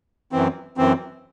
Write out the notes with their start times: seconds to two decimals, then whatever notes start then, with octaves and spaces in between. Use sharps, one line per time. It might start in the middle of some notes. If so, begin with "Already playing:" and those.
0.32 F#2 E3 C4
0.77 F#2 E3 C4